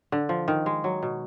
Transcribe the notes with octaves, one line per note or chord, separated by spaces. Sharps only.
D3
F3
D#3
G#3
F#3
B2